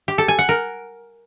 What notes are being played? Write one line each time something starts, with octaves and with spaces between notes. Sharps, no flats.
G4
A4
G#5
F#5
A#4